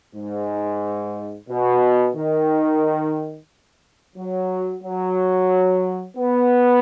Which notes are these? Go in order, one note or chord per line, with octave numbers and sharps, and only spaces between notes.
G#2
B2
D#3
F#3
F#3
B3